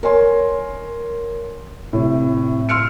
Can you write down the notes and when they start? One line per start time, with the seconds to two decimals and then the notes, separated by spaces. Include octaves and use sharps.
0.03 A#4 C#5 G#5 C6
1.93 A2 C3
2.69 C6 E6 F6 C#7 D7